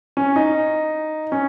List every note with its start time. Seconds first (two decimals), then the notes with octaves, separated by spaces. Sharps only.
0.17 C#4
0.36 D#4
1.32 C#4